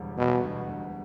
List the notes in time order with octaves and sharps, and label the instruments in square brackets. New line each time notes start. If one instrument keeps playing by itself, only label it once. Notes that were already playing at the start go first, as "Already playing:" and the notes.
Already playing: [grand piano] E1 D2 G3
[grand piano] E1 [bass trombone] B2
[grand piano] D2
D2